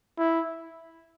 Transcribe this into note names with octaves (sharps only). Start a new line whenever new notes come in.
E4